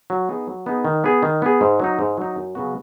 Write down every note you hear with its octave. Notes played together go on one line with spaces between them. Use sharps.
F#3
B3 D#4 G#4
F#3
B3 D#4 G#4
D#3
B3 G#4
D#3
B3 G#4
G#2
F#3 D#4
G#2
F#3 D#4
F#2
C#3 F#3 B3 F#4